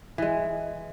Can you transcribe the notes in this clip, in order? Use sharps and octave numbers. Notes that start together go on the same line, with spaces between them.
E3 G#3